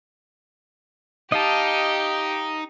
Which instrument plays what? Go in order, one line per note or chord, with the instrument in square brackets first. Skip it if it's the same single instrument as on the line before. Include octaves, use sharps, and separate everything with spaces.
[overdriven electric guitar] D#4 [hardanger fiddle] G4 [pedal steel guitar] D#5 F5 A5